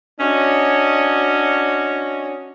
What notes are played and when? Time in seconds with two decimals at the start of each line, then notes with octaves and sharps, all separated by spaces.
0.20 C#4 D4 F#4 C#5 D#5